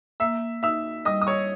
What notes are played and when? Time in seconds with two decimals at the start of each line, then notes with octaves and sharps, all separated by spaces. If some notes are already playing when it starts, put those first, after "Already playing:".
0.20 A#3 E5 E6
0.63 D#4 E5 E6
1.05 G3 D#5 D#6
1.22 D#6
1.27 C#5 C#6